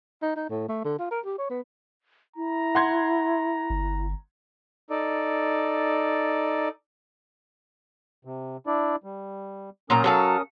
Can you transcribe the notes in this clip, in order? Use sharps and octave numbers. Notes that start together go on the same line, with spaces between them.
D#4
D#4
A2
A3
D3
F4
A#4
G4
C#5
B3
E4 A#5
F#5 C6 G#6
G1
D#4 A4 D5
C3
D4 E4 D5
G3
A#2 F#3 C#4 A#4 A#5 D#6
F#3 A4 F5